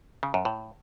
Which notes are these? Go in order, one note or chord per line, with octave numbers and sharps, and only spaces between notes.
C#3
F#2
A2